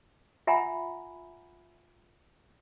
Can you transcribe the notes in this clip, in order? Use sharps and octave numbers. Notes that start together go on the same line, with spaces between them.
F4 E5 F#5 G#5 A#5 B5